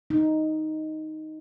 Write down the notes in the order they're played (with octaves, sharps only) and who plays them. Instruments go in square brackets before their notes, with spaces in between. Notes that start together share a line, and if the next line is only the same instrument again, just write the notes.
[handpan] D#4